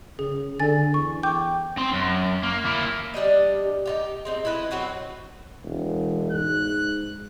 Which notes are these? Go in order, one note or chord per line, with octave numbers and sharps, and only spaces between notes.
C#3 G#4
D3 A4 G#5 A6
E2 C#6
G5 D6 G6
C4 C6
F#2
A#3
A#3 E4
G3 D4 G4 D#5
D#4 F4 G4
G#3 C4 D#4
E4 A4 B4 D#5
F#3 C4 F#4 B4
E1
G#2 F#6